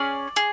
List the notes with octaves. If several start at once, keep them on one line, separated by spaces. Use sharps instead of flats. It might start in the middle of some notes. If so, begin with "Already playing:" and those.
Already playing: C#4 G#4 D5
G#4